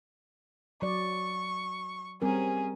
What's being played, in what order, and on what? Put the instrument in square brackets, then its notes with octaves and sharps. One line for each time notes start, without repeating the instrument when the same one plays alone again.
[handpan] F#3 D5 [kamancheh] C#6
[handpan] G3 C4 A#4 [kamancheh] C#4 G#4